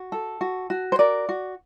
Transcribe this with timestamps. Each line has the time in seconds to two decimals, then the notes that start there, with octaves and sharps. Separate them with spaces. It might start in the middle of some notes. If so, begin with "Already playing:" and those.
Already playing: F#4
0.12 A4
0.41 F#4
0.70 F#4
0.92 C5
0.99 A#4 D5
1.29 F#4